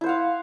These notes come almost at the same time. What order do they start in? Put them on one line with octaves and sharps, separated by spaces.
E4 C5 F#5 F5